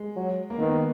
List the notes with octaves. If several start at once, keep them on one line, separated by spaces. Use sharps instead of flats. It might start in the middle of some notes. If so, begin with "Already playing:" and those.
Already playing: G#3
F#3
A#3
D#3 B3